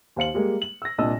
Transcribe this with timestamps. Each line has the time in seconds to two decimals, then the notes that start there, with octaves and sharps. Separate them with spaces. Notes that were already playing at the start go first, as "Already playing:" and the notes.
0.16 D#2 C5 F5 C#7 F#7
0.34 G3 G#3 A#3
0.62 F#7
0.82 E6 A#6
0.98 C2 A#2 D4 D#5 A5 E6